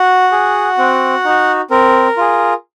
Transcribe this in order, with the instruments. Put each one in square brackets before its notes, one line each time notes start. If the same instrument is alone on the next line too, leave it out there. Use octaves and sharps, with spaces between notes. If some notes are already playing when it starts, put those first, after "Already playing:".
Already playing: [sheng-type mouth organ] F#4 F#5
G#4
C4
D#4 F#4
C4 A#4
F4 G#4